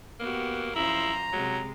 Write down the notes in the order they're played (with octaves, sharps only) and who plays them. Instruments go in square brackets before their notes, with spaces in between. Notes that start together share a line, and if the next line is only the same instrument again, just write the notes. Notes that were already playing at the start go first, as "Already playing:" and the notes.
[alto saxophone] A#3 [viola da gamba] B3 F#4 G4
[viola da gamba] F#2 F3 C5 [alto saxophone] E4 [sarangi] A#5
[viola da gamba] C3 G#3 [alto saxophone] F#3